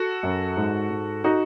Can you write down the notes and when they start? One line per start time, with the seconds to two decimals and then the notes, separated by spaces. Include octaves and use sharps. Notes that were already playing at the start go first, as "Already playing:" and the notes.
Already playing: F#4 A4
0.23 F#2
0.57 G#2
0.90 G#2
1.24 D#4 F#4